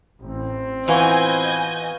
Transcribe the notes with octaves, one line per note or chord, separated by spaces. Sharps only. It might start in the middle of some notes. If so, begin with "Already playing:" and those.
A1 C4
E3 B3 F4 F#4 D#5 G#5 G6